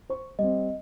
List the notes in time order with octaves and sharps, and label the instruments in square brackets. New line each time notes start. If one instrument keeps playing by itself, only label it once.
[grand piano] C5 C#6
[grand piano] G3 C4 [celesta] D#5